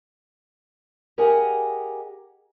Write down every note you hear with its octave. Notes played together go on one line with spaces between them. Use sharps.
G4 G#4 A#4 D#5 F#5 G#5